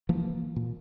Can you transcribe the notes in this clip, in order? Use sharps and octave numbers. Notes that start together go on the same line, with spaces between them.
E3 F3 A#3
A#2